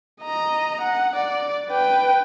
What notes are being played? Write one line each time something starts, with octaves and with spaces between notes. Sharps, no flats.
D#5 A#5
F#5
D5
B4 G5